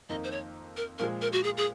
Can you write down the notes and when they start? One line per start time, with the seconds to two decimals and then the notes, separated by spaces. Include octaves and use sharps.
0.09 F2 D#3 A#3 D#4 D#5
0.24 C5
0.31 C#5
0.77 A#4
0.99 A#2 F3 G#3 A#4
1.22 A#4
1.33 F#4
1.44 G#4
1.57 G#4